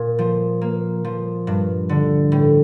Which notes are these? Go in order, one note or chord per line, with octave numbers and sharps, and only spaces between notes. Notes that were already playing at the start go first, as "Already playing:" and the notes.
Already playing: A#2
F3
A#3
F3
G2
D3
A2